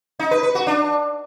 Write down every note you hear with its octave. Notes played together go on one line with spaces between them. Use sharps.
D#4
B4
B4
F#4
D4